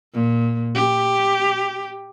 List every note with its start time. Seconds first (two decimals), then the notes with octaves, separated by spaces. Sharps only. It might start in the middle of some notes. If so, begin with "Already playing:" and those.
0.13 A#2
0.74 G4